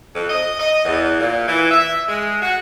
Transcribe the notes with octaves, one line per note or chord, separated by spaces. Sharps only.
F2
D#5
D#5
E2
A#2
E3
E5
G#3
F#4